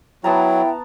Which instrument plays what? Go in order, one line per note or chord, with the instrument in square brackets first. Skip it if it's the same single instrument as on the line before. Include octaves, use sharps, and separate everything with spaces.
[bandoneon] F#3 [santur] B3 A5 A#5 [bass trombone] E4 [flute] G5